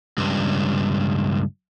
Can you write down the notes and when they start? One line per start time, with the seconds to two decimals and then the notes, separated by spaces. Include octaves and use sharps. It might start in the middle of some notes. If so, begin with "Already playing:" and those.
0.18 C#2 G2